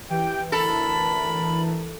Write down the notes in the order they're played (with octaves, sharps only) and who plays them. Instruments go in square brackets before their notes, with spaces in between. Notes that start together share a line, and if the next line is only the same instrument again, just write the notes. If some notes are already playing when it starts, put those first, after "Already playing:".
[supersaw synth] E3 [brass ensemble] G4 G5
[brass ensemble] D2 A#4 A5 [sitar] A4 [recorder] B5